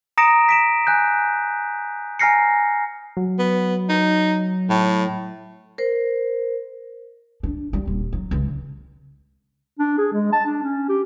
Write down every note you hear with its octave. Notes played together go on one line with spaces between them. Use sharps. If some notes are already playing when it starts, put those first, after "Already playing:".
A#5 D#6 A#6 C#7 D7 E7
B6 D7 E7
G#5 F#6 G6
G#5 A#5 F6 A#6 C7 C#7
F#3
B3
D#4
A2
A#4 C5
D4
G3
D#1
F#3
C#2
D4
G#4
G#3
A5
D4
C#4
G4